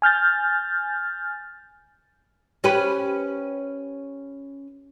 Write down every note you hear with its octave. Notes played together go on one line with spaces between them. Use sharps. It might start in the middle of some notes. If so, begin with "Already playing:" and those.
G#5 F6 G6 A6
C#4 G4 B4